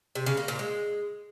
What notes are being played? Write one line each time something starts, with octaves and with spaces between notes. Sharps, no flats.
C3
C#3
A#3
A#2
G#3